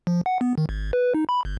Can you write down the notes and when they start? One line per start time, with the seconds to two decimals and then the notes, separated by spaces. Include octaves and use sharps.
0.07 F3
0.26 F#5
0.41 B3
0.58 D#3
0.69 G#1
0.93 B4
1.14 D#4
1.29 B5
1.45 G1